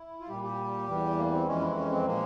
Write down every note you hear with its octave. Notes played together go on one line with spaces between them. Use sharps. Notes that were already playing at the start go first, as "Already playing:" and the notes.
Already playing: E4
F4
A#2 G3 G4
G4
E2 E3 G3
A#3
C4
F2 E3 G#3 C#4
E4
C#4
C4
A#2 F3 G#3 A#3